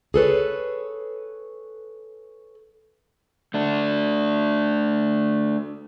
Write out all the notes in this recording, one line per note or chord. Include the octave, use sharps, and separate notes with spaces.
G#4 A4 B4 C#5
A3 D4